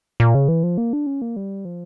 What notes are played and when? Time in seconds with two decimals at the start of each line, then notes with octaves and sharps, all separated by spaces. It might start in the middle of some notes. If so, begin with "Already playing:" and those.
0.20 A#2
0.35 C#3
0.48 E3
0.63 F3
0.78 A#3
0.93 D4
1.06 C#4
1.22 A#3
1.36 G3
1.65 F3